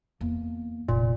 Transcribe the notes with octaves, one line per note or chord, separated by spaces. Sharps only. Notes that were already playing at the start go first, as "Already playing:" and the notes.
E2 A#3
F1 A#2